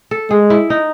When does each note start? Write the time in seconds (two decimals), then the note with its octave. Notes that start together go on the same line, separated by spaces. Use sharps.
0.11 A4
0.31 G#3 G#4
0.50 E4
0.70 D#4